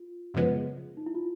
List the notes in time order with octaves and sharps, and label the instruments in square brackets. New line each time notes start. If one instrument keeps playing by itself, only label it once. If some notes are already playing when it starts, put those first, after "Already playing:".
Already playing: [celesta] F4
[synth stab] F#2 C#3 F3 G#3 B3
[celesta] D#4
E4
F4